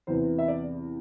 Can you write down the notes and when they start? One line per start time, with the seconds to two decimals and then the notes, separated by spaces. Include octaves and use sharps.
0.07 E2 C3 E3 B3 C5
0.38 E5
0.48 D5